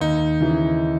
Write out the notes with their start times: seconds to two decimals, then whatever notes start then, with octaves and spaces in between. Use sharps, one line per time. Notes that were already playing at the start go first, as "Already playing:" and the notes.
0.01 D#2 D#4
0.40 C#3 E3